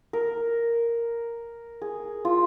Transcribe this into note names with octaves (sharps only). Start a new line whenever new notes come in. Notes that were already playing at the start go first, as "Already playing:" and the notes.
A#4
G#4
F4